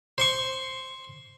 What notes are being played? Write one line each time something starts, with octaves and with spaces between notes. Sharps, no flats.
C5 C6 C#6